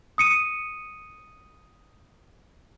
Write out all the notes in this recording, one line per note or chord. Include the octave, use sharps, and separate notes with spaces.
D#6 C#7 D#7